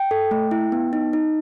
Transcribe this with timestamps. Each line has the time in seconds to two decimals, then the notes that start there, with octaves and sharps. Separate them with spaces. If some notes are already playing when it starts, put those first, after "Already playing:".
Already playing: G5
0.11 A4
0.31 A3
0.51 E4
0.72 B3
0.93 D#4
1.13 D#4